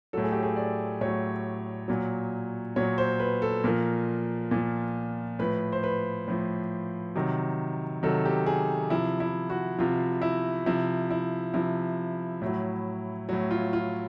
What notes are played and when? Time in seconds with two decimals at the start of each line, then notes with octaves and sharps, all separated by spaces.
0.13 A2 F#3 A4
0.23 G#4
0.32 G4
0.43 G#4
0.56 D5
1.01 A2 F#3 C#5
1.88 A#2 F#3
2.76 A#2 F#3 C#5
2.98 C5
3.20 B4
3.42 A4
3.64 A#2 F3 A#4
4.51 A#2 F3
5.39 A2 F3 B4
5.73 C5
5.84 B4
6.28 A2 F3
7.15 C3 D#3 F#3
8.03 C3 D#3 F#3 A4
8.25 G4
8.46 G#4
8.90 C3 F3 E4
9.20 E4
9.50 F#4
9.79 C3 F3 F4
10.22 E4
10.66 C3 F3 E4
11.10 E4
11.54 C3 F3 E4
12.41 A2 F#3
13.29 A2 F#3
13.51 F4
13.73 F4